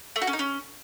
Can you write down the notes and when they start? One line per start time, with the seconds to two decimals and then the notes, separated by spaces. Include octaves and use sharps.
0.16 A3
0.22 F#4
0.27 C#4
0.33 D#4
0.39 C#4